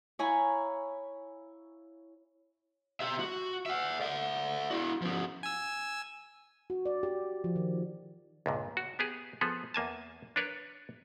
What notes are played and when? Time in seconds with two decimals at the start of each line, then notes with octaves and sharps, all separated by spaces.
0.19 E4 C#5 F5 G#5 A#5 B5
3.00 G4 E5
3.20 F#4
3.66 E5 F#5
4.01 D5 E5
4.70 E4 F#4
5.02 F3 C#4
5.43 G#5 E6
6.70 F#4
6.86 D5
7.03 G4
7.44 F3
7.56 D#3
8.46 C#2 G2 A#2
8.77 F#4
8.99 B3 G4 G#4
9.41 F3 B3 G#4 A4
9.74 E2 A#3 G#5 A5
10.36 D4 A#4 B4 C#5 D5